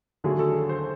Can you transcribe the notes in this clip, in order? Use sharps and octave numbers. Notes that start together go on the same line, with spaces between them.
D#2 D3 F#3 A3 G#4
A4
C5